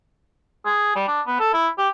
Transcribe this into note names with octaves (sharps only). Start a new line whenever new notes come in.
G#4
G3
D4
B3
A4
E4
G4